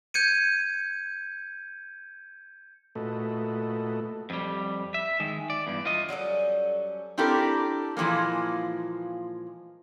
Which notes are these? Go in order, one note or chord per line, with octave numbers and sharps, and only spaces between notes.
G6 G#6 C#7 D#7
A#2 A3 F#4 A4 B4 D#5
F2 G3
E5
D#3 G#3
D5
E2 G2
F4 D#5
F#3 G3 C#4 A4
C4 D4 E4 G4 A4 A#4
A#2 E3 F3 G#3 A#3